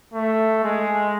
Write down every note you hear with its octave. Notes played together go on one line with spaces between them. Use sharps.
A3
G#3